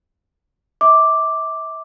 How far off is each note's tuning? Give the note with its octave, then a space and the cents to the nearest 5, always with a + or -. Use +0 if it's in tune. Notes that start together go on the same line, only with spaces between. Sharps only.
E5 -35 D6 +0